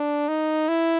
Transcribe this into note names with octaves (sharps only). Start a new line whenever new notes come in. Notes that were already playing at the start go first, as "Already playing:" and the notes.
Already playing: D4
D#4
E4